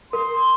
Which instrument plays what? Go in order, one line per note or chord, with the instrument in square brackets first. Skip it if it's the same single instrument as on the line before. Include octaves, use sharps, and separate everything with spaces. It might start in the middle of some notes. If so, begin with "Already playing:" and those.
[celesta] A#4 [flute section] C6